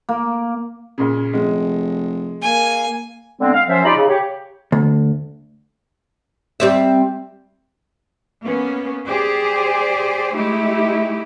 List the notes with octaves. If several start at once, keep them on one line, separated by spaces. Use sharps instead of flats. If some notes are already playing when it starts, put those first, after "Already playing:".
A#3
A#2 C#3
F1 G#3
A#3 G#5
D3 G#3 B3 C4
F5
F#2 F3 C#4 C5 E5
D#4 F4 G4 D5 A#5 B5
C#3
G4 C#5
D2
G3 C4 E5
A#3 B3 C#4
G4 G#4 C5 D5
G#3 A3 D#4 E4 G4